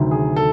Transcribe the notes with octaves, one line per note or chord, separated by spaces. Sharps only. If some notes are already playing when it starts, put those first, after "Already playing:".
Already playing: D2 C3 D#3 F#3
G#4
A4